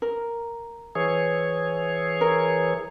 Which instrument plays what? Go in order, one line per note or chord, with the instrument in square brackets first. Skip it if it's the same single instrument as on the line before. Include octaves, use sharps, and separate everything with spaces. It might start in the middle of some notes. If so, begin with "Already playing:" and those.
[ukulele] A#4
[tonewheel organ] E3 G#4 C#5
[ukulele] A#4